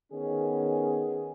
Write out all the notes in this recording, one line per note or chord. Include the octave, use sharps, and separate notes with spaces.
D#3 B3 C#4 G#4